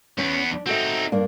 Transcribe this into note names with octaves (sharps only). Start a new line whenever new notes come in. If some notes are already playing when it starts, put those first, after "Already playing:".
E2 B3 C#4
D4
C4 D#4 F#4 A4 E5
G2 A#3 D4